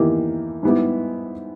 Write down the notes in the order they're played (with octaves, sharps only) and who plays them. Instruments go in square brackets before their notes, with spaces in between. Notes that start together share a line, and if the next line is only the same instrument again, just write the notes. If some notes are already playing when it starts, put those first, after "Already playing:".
Already playing: [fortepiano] E2 D#3 A#3 E4 G4
G#2 G3 B3 E4 G4